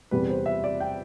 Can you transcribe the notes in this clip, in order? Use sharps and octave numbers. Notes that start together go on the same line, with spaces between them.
E2 C3 G3 B4
C5
E5
D5
G5